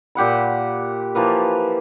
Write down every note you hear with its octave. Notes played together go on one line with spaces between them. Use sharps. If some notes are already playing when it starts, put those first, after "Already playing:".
A#2 G4 F#5 B5
E3 F3 A#3 B4